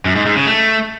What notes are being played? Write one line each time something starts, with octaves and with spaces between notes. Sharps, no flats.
F#2
G#2
G#2
C#3
A3